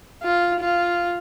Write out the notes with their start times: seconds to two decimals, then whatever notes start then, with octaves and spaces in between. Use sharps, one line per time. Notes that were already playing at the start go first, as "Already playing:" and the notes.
0.23 F4
0.61 F4